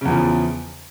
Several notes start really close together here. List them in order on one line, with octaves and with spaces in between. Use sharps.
C#3 E2 F3